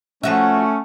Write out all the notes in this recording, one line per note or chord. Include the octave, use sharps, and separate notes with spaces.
F3 A3 C#4 F#4 E5